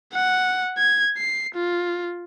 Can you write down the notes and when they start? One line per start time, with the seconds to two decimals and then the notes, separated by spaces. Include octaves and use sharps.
0.13 F#5
0.78 G#6
1.18 C7
1.55 F4